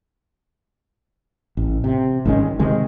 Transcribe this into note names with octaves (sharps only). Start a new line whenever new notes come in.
A1
C3
G#1 D#3 G#3 C#4
C3 D#3 G#3